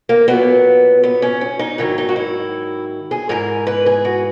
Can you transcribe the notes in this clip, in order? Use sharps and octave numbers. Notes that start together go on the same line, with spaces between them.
A#3
A#2 F#3 B3
B3
C#4
C#4
D#4
G#2 D#3 F#3 E4
D#4
F#4
E4
G#4
G#2 E3 A#4
B4
G#4
F#4